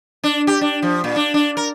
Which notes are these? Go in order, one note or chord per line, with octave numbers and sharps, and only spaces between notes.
D4
G4
D4
F3
A#2
D4
D4
A#4